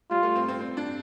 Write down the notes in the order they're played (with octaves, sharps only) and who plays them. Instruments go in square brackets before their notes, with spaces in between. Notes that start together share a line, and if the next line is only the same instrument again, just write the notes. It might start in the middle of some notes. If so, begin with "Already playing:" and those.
[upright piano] G3 [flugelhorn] F4
[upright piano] A3
C4
C4
C4
D4